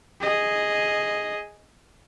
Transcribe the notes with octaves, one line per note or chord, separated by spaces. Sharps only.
G#4 D#5